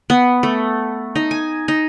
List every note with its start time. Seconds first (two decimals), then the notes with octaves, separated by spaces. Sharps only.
0.10 B3
0.43 A3
1.15 D#4
1.31 G#5
1.68 D#4